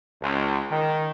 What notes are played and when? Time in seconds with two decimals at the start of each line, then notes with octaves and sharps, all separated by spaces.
0.21 C#2
0.70 D#3